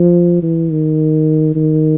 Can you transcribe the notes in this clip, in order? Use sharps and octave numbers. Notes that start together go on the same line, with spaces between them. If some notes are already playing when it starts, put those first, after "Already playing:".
Already playing: F3
E3
D#3
D#3